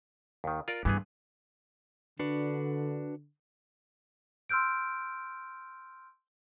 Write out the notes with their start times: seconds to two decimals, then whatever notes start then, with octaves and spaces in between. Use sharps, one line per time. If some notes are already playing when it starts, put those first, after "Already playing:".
0.44 D#2 D#3
0.68 F4 A#4 D5
0.85 G2 E3 B3 G#4
2.19 D3 D4 F#4 B4
4.49 C6 E6 F6 G6 D7